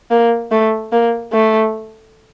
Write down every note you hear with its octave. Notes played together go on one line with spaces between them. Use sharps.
A#3
A3
A#3
A3